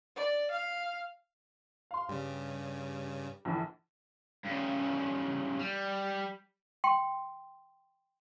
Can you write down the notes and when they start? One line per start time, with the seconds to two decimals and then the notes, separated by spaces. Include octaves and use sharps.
0.16 D5
0.51 F5
1.91 F5 C6
2.09 G2 C#3 G3
3.45 A#1 D3 E3
4.45 G2 C#3
5.59 G3
6.84 G5 C6